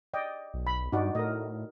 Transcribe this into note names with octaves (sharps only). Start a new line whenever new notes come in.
D5 D#5 G5
B1
B5
G2 D#4 F#4 D5
A2 A#4 D#5